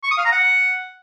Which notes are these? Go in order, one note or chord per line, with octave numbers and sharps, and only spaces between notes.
C#6
D#6
F5
A#5
F#5